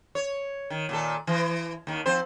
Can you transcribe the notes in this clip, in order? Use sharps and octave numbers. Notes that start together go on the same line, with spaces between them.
C#5
D#3
A#2 D#3 A4
E3
D#2 D#3
F3 C4 C5